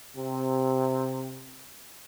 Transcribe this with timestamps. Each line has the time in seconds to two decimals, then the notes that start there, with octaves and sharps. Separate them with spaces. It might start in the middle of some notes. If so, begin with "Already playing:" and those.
0.17 C3